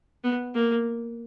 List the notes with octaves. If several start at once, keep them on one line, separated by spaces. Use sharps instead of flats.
B3
A#3